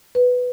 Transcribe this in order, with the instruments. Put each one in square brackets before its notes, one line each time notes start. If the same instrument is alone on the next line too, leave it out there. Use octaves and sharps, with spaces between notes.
[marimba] B4